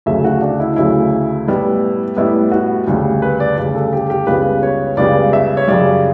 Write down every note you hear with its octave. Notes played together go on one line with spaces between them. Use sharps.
D2 C#3 F#3 A3 E5
F#4
D4
E4
D2 C#3 F#3 A3 E4
A2 G3 B3
A2 G3 B3 E4
F#4
D2 C#3 G3
B4
D5
D2 C#3 G3 D5
A4
G4
G4
C#2 C#3 G3 B3 B4
C#5
C#2 C#3 G3 B3 D5
E5
C#5
F#2 C#3 G3 D5